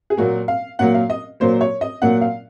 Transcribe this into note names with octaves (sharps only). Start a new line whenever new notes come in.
G#4
A#2 F#3 A#3 F#4
F5
A#2 F#3 A#3 F#5
F5
D#5
A#2 F#3 A#3 C5
C#5
D#5
A#2 F#3 A#3 F#5
F5